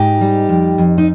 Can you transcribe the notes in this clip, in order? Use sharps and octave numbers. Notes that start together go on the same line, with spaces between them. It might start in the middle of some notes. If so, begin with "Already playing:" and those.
Already playing: G#2 D#4 G4
G3
F2
F2
D#4